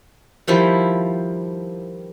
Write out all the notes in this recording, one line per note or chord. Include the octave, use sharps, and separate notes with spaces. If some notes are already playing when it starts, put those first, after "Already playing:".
D#3 F3 G3 E4